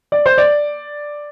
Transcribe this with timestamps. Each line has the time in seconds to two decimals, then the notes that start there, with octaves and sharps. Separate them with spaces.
0.12 D5
0.26 C5
0.38 D5